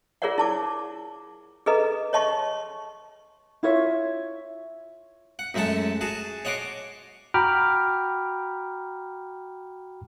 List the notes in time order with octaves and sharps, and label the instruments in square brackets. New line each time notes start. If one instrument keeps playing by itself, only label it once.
[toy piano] F4 G#4 A#4 C#5 D5 F#5
E4 A5 D6
G#4 A4 B4 D#5 A#5
C#5 D#5 A5 C6 C#6
[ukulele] E4 F4 C#5 E5
[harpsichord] F#5
F#2 G#3 A3 A4 F#5 A5
F#4 G#4 A5
C#5 D#5 F#5 C6 D6
[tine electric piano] F#4 G5 A#5 B5 D6 F6